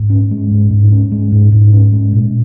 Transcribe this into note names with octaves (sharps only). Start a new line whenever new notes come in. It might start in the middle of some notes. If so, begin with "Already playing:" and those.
Already playing: G#2
C#4
G#3
G#2
G#2
C#4
G#3
G#2
G#2
C#4
G#3
A#2